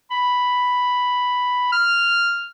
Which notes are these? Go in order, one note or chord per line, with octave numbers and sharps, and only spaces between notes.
B5
F6